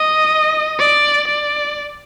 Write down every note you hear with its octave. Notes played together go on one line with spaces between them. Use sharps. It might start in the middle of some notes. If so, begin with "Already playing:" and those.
Already playing: D#5
D5
D5